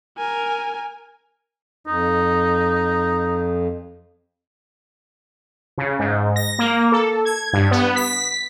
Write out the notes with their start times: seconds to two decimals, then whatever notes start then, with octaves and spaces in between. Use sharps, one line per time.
0.17 A#4 G#5
1.87 F2 D#4
5.78 C#3
5.99 G#2
6.36 A#6
6.59 A#3
6.92 A4
7.25 G#6
7.53 G2
7.71 B3
7.96 B6